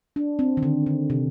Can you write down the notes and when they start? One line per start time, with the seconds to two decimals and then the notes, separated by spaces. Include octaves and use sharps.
0.16 D4
0.39 C4
0.57 D#3
0.63 D3
0.86 D3
1.10 C3